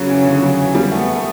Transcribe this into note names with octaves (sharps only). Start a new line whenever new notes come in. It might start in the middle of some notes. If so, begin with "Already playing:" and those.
Already playing: C#3 F#3
E3
D3
F#3
E3
G3
A3 B3
A3